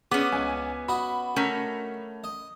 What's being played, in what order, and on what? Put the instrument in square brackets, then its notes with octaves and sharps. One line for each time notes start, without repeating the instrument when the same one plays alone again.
[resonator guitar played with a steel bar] B3 C#4 [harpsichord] G#4 [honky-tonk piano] D6
[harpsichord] C#2 [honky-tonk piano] G#5
[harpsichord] F#4 D#5 [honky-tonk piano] B5
[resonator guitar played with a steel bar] A3 C#4 A#4
[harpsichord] D#5